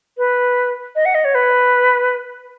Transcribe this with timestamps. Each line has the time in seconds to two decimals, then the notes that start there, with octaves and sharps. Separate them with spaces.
0.18 B4
0.96 D#5
1.05 F#5
1.15 D#5
1.25 C#5
1.35 B4